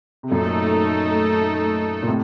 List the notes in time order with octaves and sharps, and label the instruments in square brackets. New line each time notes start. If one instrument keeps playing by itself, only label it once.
[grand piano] C3
[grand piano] F#2 A#2 [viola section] A3 D#4 A4
[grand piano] A#2
A2 C3